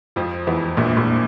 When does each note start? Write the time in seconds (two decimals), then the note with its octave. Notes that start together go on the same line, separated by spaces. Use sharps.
0.16 F2 F3
0.47 E2 E3
0.77 A#1 A#2
0.97 A#1 A#2